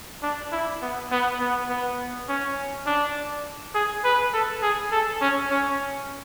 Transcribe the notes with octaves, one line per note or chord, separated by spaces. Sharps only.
D4
E4
B3
B3
B3
B3
C#4
D4
G#4
B4
A4
G#4
A4
C#4
C#4